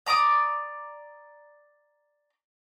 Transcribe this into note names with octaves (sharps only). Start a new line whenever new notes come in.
D5 A#5 D6 D#6